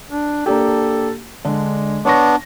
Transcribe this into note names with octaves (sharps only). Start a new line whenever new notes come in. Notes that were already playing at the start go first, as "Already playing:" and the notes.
D4
A#3 D4 G4 A4
D3 G#3 D4 D5
B3 D4 C#5 C#6 A#6